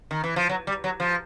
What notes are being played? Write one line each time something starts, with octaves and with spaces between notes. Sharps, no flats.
D#3
E3
F3
F#3
G3
F#3
F3